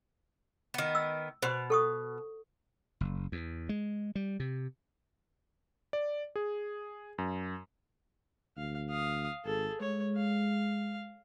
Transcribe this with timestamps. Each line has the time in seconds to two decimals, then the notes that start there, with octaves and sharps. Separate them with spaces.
0.74 D#3 B3
0.95 E6
1.42 B2 C5 C6
1.70 A4 C#6 D#6
3.01 F#1
3.32 E2
3.69 G#3
4.15 G3
4.40 C3
5.93 D5
6.36 G#4
7.18 F#2
8.57 D2 F5
8.90 F5 D#6
9.45 G#1 G#4 A4
9.81 G#3 C#5
10.16 F5